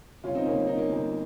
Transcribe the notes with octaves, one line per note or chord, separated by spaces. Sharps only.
G1 C#4 F4
C4 D#4
G1 A#3 C#4
C#4
G1 D#4
A#3 C#4
G1